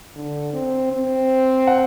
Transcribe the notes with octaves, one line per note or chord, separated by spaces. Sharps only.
D3
C4
C4
F#5